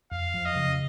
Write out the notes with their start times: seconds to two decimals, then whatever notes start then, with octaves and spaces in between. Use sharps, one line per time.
0.12 F2 F5
0.34 F3
0.46 D#5
0.56 C#3